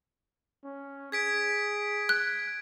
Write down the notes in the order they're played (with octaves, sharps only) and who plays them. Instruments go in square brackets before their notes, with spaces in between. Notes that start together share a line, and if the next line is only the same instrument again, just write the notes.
[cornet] C#4
[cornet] G#4 [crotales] G#6 B6 D7
[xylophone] F#6